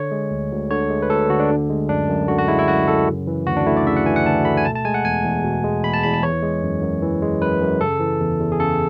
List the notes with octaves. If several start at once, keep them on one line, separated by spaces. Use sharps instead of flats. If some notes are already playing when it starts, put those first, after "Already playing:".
Already playing: D3 C#5
G#3
D2
D2
D3 C#5
G#3
B4
D2 A4
D2 F#4
D4
D3
G#3
F#2 D4
F#2
D3 F#4
F#4
G#3 E4
E4
F#2 F#4
F#2 A4
C#3
E3
D2 F#4
D4
A3 E4
D5
C#3 E5
F#5
E3 G#5
F#5
D2 A5
A3 B5
G#5
B2 A5
A5
G#3 G#5
F#5
E2 G#5
E2
B2
G#3
E2 B5
A5
E2 B5
A5
E3 C#5
G#3
F#2
F#2
E3
G#3
F#2 B4
F#2
C#3 A4
E3
E2
E2
G#4
C#3 A4